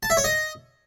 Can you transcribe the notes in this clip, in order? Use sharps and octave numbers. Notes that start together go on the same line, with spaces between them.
A5
E5
C#5
D#5